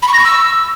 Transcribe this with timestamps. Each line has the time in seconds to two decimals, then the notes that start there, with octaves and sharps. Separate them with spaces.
0.02 B5
0.08 C#6
0.13 A#6
0.19 C#6
0.24 E6